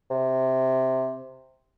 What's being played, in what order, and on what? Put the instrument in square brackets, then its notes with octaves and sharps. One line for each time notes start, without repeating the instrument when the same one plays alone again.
[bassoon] C3